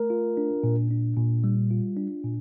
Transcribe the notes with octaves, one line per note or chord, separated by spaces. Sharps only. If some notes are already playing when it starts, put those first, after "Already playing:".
Already playing: A3 A#4
F4
D4
A#2
D4
A#2
G3
F4
D4
A#2